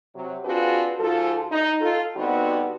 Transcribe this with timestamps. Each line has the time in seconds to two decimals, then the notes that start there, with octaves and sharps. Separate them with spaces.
0.16 C3 F#3
0.45 C4 D4 F4 F#4 G#4 B4
1.00 G#2 F3 F4 F#4 A4
1.52 D#4
1.81 F4 A4
2.16 D3 G3 B3 C4 D#4 F#4